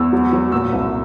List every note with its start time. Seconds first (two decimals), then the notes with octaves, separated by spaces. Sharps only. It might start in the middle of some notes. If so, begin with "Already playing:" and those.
Already playing: E2 E6
0.13 F#3
0.32 F#3
0.52 A#2 E6
0.72 C2